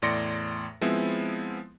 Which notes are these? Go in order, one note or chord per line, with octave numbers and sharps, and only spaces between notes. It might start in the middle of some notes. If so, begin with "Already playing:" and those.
E2 A2 D5 C6 A#6 C#7
F3 G#3 B3 C4 E4